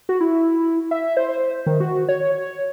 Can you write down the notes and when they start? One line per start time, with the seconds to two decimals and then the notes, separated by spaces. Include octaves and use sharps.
0.09 F#4
0.21 E4
0.91 E5
1.17 C5
1.66 D#3
1.80 F#4
2.09 C#5